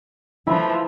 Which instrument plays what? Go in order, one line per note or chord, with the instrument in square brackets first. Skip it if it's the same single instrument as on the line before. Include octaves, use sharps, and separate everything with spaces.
[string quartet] E3 F3 A3 [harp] E4 B5